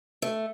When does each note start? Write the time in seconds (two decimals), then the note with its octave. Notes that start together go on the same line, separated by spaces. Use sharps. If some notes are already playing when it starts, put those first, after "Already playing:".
0.22 A3